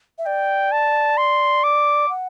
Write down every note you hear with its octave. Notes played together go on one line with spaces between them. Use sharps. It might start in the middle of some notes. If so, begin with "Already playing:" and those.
E5
D5 G5
A5
C6
D6
F#5